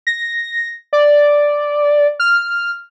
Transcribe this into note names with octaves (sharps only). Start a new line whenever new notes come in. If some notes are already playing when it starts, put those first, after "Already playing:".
A#6
D5
F6